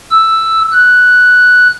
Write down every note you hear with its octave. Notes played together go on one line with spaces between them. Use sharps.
E6
F#6